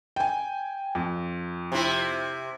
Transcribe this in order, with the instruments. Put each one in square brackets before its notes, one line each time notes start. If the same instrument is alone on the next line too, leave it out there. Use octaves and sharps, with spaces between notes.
[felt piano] G5 G#5
F2
[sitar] C3 E4